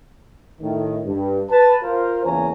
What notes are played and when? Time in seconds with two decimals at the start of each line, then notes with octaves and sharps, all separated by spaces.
0.61 A2 D#3
1.06 G2
1.50 B4 A5
1.82 F4 A#4 C5
2.24 E2 C#3 A#3 C#5 G#5 A#5